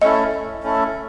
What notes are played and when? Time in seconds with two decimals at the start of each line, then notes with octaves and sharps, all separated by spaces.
0.02 A3 C#4 E4 A4 D#5
0.63 A3 C#4 E4 A4